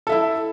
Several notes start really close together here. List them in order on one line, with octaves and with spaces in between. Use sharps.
A4 E5 E4